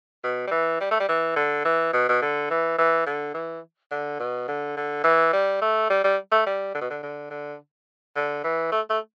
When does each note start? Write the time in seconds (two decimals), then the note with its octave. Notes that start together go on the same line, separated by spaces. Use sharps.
0.24 B2
0.48 G3
0.51 E3
0.81 G3
0.91 A3
1.00 G3
1.09 E3
1.36 D3
1.65 E3
1.93 B2
2.09 B2
2.22 D3
2.50 E3
2.78 E3
3.06 D3
3.34 E3
3.91 D3
4.20 B2
4.48 D3
4.77 D3
5.04 E3
5.33 G3
5.62 A3
5.90 G3
6.04 G3
6.32 A3
6.47 G3
6.75 D3
6.81 B2
6.90 D3
7.03 D3
7.30 D3
8.16 D3
8.44 E3
8.72 A3
8.90 A3